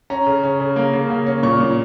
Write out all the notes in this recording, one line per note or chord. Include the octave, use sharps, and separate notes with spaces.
C#4 A#5
C#3
C#4
C#3
A#3
C#3
A#3
C#4
A#2 C#6
A#2